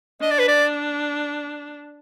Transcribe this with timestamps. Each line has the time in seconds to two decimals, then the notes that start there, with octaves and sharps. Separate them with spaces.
0.22 D4 D#5
0.31 D5
0.39 B4
0.48 D5